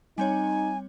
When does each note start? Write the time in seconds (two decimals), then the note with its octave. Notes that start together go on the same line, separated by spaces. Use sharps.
0.18 G3 C4 D#4 C#5 G#5